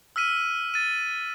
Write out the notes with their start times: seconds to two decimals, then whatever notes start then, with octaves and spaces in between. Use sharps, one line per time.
0.16 E6 F6 B6 D#7
0.74 A6 D#7